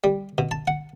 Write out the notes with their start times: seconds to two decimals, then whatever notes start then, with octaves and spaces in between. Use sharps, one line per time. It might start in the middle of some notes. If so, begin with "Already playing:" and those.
0.04 G3
0.38 B2
0.51 A5
0.68 F#5